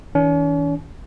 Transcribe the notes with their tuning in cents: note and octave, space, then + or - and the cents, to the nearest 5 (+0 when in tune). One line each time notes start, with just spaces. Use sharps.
E3 -40 C#4 +45